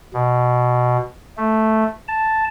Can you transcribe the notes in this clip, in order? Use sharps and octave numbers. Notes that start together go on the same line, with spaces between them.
B2
A3
A5